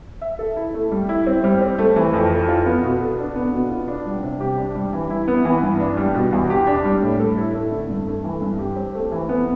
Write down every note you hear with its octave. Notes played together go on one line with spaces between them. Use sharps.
E5
A4
E4
A3
G3
E4
C4
G3
C4
A3
E3
F2
A4
F4
B3
B2
A4
D4
B3
B2
F4
D4
G3
C3
G4
D4
G3
E3
E4
B3
E3
G2
D4
G3
B2
E2
G4
D4
G3
A2
A4
E4
A3
D3
G2
A3
E3
G2
G4
C4
A3
E3
B3